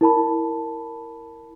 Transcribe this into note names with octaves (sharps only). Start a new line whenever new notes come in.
E4 A#4 A5 B5